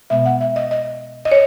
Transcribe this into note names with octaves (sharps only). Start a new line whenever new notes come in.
B2 G#3 B3 E5
F#5
E5
D#5
D#5
D#5
C#5